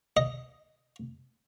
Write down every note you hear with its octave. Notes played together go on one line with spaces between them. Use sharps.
D#5